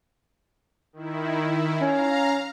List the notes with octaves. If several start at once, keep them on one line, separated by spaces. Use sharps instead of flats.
D#3 E4
C#4 F5 A#5